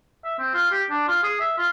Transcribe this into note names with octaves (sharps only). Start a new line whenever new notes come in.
E5
C4
F4
G4
D4
F4
G#4
E5
F4